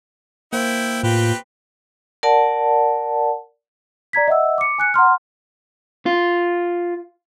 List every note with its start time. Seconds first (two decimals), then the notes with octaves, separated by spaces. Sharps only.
0.53 A#3 E4 C5 G5
1.03 A2 C4 F4 G4 B4
2.23 A#4 D5 F#5 A5
4.13 D5 A#5 G#6 B6
4.28 D#5 E5 F#5 E6
4.58 D6 C#7
4.78 G#5 F#6 C#7
4.94 F#5 A#5 C6 F6
6.06 F4